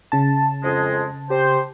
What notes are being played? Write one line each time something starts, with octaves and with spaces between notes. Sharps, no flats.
C#3 A5
F2 G#3
C4 G4 C5